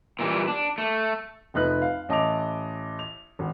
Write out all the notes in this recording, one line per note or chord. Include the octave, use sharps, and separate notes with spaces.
A#2 E3 F#3 G3
D4
A3
F1 D#4 B4 F#6
F5
A1 D#5 A5 D6 F7
F7
G#1